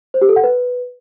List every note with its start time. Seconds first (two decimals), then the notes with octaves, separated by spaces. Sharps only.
0.14 C5
0.22 G4
0.29 A4
0.36 F#5
0.44 B4